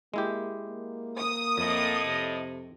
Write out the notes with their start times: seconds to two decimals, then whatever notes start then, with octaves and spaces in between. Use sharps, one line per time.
0.14 G#3 A#3 E4 G4
0.69 A#3
1.18 D#6
1.58 F2 A2 D#5
2.06 C3